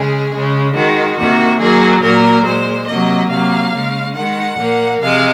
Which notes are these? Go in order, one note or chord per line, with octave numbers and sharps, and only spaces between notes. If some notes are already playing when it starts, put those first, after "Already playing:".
Already playing: C#3 G#3 G#4
C#3 G#3
D#3 G#3 F#4
C3 D#3 A#3 F#4
D#3 F#3 A#3 G#4
A#2 F#3 A#3 A#4
A#2 G#3 C5
C3 F#3 A#3 D#5
C3 F#3 A#3 F5
C#3 G#3
D#3 G#3 F#5
A#2 F3 A#3
C3 F3 G#3 F5